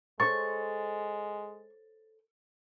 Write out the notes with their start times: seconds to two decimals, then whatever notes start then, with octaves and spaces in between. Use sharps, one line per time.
0.20 G#3 A4 C5 C#5 C#6 A6